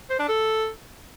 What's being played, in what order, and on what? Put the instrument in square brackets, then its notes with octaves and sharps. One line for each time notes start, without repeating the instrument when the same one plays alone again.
[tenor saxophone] C5
D4
A4